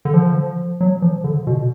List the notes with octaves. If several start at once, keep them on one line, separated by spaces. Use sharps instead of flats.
D3
F3
F#3
F3
D3
B2